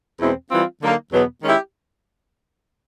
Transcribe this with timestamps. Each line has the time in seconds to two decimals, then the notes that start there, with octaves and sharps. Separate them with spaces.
0.19 E2 B2 G#3 C4 E4
0.50 E3 G3 C4 F4
0.81 D3 F#3 A#3 D#4
1.12 E2 B2 F#3 B3
1.42 D#3 G#3 C#4 E4 G4